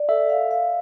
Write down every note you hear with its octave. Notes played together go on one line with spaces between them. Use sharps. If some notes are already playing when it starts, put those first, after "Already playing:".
Already playing: D5
A4 E5
F5
F5